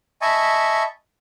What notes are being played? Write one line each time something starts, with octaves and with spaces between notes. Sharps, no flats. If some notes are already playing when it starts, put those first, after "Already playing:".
D#5 E5 G#5 A5 B5 C#6